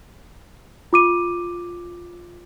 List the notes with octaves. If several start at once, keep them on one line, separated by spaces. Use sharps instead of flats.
F4 D6 D#7